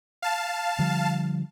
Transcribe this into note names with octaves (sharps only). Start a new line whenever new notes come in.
F5 A5
D3 F3 G3